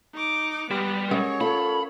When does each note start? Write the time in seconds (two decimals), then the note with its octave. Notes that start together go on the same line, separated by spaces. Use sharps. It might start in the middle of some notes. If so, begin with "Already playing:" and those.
0.14 D#4 D6
0.71 G3 B3 G4
1.11 G#3 C#4 A#4 C#5
1.41 F4 A4 B5